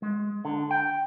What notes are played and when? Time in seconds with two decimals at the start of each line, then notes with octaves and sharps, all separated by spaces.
0.02 G#3
0.45 D3
0.71 G5